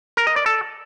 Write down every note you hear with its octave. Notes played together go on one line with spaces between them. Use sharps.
A#4
D#5
D5
A4